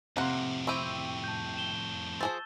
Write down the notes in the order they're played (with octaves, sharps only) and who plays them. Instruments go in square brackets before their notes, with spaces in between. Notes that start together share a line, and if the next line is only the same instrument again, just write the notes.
[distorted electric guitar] F2 A2 [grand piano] C3 C6 [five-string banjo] A#3 F#5
[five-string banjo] C4 E4 G4 [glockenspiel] C#6 D#7
[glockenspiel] A5 G6
E7 G7
[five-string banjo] F3 G#4 C5 [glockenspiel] E6 A6